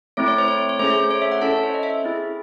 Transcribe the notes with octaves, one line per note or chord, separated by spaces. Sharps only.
A3 C4 E4 C#5
C#5
C5
C#5
C#5
C#5
A3 C#4 G#4 C5
C#5
C5
C#5
E5
F#5
C#4 E4 A4 A5
C#5
C5
D#5
E5
C4 E4 G#4